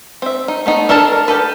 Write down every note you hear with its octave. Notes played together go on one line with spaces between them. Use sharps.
C4 E5
D#4
A3 B3 D#4
D4 A4 A#4 A5 A#5
A#4
G4 A4 B4